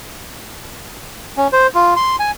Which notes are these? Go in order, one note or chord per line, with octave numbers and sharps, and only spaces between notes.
C#4
C5
F4
C6
G#5